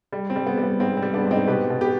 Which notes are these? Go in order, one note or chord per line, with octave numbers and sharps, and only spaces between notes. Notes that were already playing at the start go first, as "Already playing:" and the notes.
G3
C4
G3
B3
G3
B3
G#2 C4
C4
G3
B3 D4
G#2
C4 D#4
B2 G4 B4
B2
G4 B4